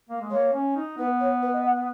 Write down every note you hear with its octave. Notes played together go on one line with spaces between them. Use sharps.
A#3
G#3
A#3 C#5
C#4
D#4
B3 B4
C#5
B4
D#5
F#5